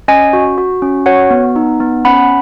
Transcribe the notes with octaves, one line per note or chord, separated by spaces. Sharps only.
C#4 D#5 G#5
F#4
F#4
C#4
F#4 C#5 F#5
B3
D#4
B3
C#4 F#5 B5